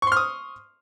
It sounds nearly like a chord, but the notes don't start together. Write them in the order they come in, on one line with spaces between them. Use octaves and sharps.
C#6 C6 F6 D#6